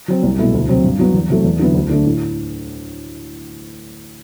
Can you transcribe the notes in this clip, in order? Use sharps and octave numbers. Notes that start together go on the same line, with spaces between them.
F#3 C4
C2
B2 A3 E4
D2
C3 F#3 C4
G2
F#3 B3
E2
C3 F#3 A3
E2
D3 F#3 B3 E4
D2
D3 A3 D4
A2